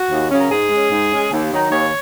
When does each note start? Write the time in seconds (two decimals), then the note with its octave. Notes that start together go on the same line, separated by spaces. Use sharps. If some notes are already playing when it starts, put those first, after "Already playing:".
Already playing: F#4
0.10 D#2
0.30 C#3 F#3 C#4
0.39 A#4
0.50 G#2 G#4
0.70 G#3 C#4
0.91 G#2
1.10 G#3 C#4
1.30 D#2
1.50 D#3 F#3 D#4
1.70 D#2 C#5